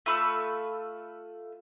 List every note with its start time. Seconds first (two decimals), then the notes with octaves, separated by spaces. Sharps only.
0.06 A3 F4 B5 E6